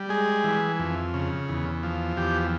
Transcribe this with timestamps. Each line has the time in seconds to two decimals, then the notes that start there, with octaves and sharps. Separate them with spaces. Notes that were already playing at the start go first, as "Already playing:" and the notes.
Already playing: G3
0.09 G#3 G#4
0.44 E3
0.79 F2
1.14 C#3
1.49 E2
1.83 F3
2.17 E2 G4